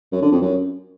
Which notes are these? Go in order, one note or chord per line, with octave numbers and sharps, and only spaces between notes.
F#2
D3
F2
F#2